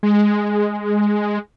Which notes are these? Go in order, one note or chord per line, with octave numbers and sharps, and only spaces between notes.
G#3